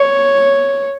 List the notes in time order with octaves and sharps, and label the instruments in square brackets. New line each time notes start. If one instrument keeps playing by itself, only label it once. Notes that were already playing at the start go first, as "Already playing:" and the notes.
Already playing: [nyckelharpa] C#5